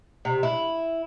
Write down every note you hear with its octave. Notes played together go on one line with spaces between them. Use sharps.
C3
E4